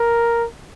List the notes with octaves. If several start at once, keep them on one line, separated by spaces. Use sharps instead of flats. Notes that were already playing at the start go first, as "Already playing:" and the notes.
Already playing: A#4